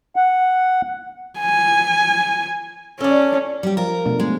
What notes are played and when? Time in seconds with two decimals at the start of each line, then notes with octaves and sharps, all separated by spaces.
0.16 F#5
1.39 G#5
3.01 C#4 A4 D5
3.63 G3 G4
3.77 F3 F4 A#4
4.05 B2 A3 D4
4.19 G#3 C#4